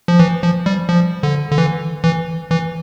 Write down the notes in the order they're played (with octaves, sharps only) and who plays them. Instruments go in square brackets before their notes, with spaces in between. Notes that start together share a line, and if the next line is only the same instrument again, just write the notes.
[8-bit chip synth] F3
E3
F3
G3
F3
D3
D3
E3
E3
E3